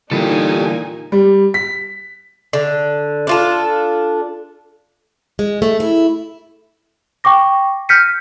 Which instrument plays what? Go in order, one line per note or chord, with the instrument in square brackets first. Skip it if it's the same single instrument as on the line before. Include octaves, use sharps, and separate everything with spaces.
[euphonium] A#2 [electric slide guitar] D3 E3 G3 [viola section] D#4 G#5 [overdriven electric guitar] G4 A4
[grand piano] G3
B6
[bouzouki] D3
D4 F4 A4
[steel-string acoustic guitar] G#3
A3
E4
[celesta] G5 C#6 D6 A#6
F6 G6 A#6 B6 C#7 D#7